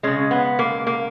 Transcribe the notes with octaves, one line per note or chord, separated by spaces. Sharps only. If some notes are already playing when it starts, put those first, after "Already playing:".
C#3 G#3 C#4
B3
A#3
A#3